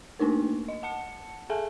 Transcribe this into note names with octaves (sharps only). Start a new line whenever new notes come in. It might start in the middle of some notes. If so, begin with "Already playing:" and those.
A3 A#3 D4 D#4 A#4
D#5
F#5 A5 C#7
G#4 A4 E5 G#5 A5